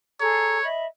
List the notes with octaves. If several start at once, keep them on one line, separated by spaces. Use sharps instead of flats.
G#4 A4 C#5 A#5
D#5 E5 B5